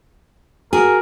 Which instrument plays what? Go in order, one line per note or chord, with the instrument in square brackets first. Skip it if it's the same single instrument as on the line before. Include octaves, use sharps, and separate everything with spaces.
[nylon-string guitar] F#4 G#4 [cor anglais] A#4